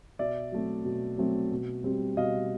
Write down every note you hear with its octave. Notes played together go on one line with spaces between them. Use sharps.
B2 D5 E5
F#3 A3 C4
B2
F#3 A3 C4
B2
G3 C4
B2 D#5 F5